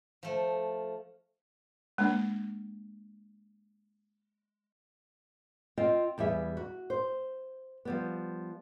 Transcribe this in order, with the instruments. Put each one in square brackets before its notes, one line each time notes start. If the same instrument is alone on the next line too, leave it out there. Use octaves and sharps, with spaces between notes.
[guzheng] F3 A3
[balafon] G#3 A#3 D4
[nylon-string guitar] C4 F4 D#5 G5
E2 G3 G#4 E5
F#4
C5
F3 G3 B3